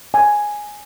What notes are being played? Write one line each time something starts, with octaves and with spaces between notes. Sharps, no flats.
G#5